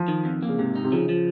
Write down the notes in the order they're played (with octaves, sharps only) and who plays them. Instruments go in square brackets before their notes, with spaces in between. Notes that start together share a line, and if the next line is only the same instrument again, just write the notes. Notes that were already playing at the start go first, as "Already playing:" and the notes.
Already playing: [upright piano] F3
[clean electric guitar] D#3
F2
A#3
[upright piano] C#3
[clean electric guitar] G#2 [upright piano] C3
[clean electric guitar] D#4
[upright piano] C3
[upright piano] C#3 [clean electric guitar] F3
[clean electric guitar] F3